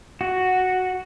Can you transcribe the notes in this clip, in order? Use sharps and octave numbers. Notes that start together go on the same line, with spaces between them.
F#4